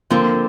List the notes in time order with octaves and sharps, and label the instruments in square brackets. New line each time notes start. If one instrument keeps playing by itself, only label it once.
[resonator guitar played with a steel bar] D3 F3 C4 [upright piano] A#3